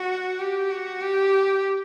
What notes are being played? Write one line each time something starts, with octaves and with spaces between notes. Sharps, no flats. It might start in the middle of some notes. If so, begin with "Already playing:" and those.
Already playing: F#4
G4
F#4
G4